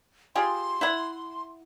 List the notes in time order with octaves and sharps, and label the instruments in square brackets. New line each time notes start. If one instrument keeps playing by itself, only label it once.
[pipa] F4 G4 G#4 [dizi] C6
[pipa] E4 E5 F#5